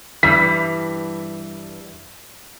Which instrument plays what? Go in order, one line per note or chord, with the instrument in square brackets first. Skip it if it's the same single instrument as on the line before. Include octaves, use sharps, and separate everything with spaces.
[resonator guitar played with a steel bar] G2 E3 G3 [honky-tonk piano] B6